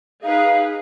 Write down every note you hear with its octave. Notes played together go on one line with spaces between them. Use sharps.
D#4 G#4 B4 F5